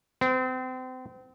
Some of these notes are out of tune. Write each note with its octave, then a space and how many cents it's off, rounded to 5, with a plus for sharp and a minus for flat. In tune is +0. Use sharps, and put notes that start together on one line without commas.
C4 -35